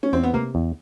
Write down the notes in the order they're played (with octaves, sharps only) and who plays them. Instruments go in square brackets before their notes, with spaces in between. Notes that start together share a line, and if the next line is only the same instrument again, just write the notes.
[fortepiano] C#4
[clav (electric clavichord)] E2 [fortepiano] C4
[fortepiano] B3
[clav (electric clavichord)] C3 [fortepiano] A#3
[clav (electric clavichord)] E2